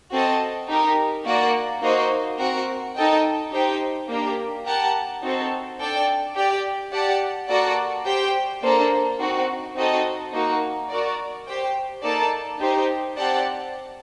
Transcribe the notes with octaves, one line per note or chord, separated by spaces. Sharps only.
C4 F#4 A4 D#5 A5
D#4 G4 A#4
A#3 F#4 A#4 D5 F#5
A#3 D#4 F#4 C5 D#5
C4 F#4 A#4 F#5
D#4 A4 D#5 G5
D#4 G4 C5 G5
A#3 D4 G4 A#4
G4 A#4 F#5 A5
C4 D#4 F#4 A4 C5
D4 A4 D5 G5
G4 D5 G5
G4 D5 F#5 A5
A#3 F#4 A4 D5 F#5
G4 C5 G5
A#3 D4 A4 C5
C4 D#4 F#4
C4 D#4 F#4 A4 D#5
A#3 D#4 F#4
F#4 A#4 D5
G4 C5 G5
A#3 D#4 A4 D5 A5
D#4 G4 C5
C4 G4 D5 F#5 A5